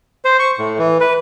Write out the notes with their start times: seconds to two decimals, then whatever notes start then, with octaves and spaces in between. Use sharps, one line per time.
0.25 C5
0.39 C#6
0.59 A2
0.79 E3
1.00 B4